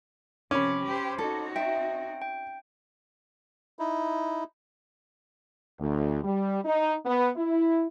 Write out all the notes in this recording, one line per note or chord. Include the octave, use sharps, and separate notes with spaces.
C3 F3 C#4 B5 D6
G4 C5
C4 D#4 F#4 A4
E5 G5
G5
D#4 E4
D2
G3
D#4
B3
E4